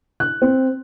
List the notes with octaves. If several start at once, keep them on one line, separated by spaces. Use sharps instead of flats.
F#6
C4